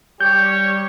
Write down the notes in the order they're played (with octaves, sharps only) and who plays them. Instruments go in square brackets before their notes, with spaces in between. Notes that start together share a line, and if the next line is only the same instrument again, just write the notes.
[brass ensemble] G3 G4 C#5 [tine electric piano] G6